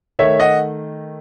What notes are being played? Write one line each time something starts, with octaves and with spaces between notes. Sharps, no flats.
D#3 A3 C#5 E5
D#5 F#5